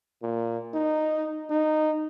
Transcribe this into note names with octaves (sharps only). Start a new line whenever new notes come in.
A#2
D#4
D#4